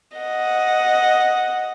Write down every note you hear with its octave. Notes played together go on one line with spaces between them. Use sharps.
D#5 F#5